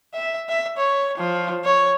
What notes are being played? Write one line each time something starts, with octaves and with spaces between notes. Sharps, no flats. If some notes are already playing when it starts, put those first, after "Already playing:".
E5
E5
C#5
F3
C#5